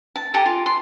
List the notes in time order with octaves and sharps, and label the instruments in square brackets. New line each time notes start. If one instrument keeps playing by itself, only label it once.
[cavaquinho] A5
G4 A4 G#5 A#5
F4
C6